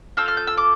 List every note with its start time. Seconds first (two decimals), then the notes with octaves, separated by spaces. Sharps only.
0.17 C4 F4 A4 E6
0.28 F6
0.37 G6
0.47 E6
0.57 D6